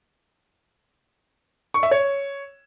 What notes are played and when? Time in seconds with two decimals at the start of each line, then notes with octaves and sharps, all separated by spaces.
1.74 C#6
1.83 E5
1.91 C#5